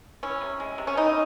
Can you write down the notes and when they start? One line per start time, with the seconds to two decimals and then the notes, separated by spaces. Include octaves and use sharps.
0.23 E3 C#4
0.41 C3
0.60 G#3
0.78 C3
0.87 C#4
0.97 E3 D#4